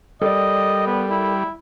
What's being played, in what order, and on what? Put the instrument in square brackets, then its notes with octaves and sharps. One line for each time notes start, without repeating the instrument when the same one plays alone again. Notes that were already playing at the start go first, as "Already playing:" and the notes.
[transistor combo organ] G3 [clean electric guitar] A4 A#4 D5 [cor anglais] D#5
[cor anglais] B3
E4